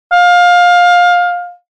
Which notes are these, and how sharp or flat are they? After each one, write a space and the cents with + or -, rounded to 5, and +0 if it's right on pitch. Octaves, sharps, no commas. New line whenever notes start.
F5 +20